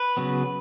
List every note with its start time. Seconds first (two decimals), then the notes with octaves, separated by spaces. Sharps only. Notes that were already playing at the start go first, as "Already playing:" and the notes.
Already playing: B4
0.17 C#3 F#3 B3